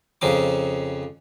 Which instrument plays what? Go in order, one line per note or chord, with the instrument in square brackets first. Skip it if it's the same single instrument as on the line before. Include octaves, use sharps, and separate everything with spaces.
[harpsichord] F2 C#3 F3 D#4 D6